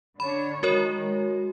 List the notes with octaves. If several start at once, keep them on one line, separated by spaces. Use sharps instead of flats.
D3 D4 C#5 B5
D#3 G#3 F#4 A#4 C#5
G#3